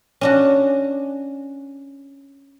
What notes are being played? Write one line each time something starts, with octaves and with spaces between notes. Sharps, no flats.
C#4 D4 F#4